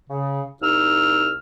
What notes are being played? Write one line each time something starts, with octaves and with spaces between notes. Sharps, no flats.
C#3
C2 D#4 E6 F6